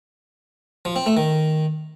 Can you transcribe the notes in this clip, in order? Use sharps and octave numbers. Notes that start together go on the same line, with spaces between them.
F3
C4
A3
D#3